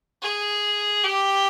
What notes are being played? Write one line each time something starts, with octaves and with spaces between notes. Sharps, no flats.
G#4
G4